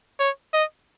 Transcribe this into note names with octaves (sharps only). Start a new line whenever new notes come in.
C#5
D#5